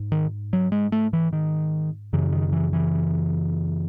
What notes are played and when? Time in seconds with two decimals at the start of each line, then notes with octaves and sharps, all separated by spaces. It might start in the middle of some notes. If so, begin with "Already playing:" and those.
Already playing: G#2
0.12 D#3
0.53 F#3
0.72 G#3
0.92 A3
1.13 E3
1.33 D#3
2.13 F#2 C#3 E3
2.33 D#3
2.52 E3
2.73 E3